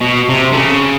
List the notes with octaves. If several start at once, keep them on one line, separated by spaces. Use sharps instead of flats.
B2
C3
D3
C#3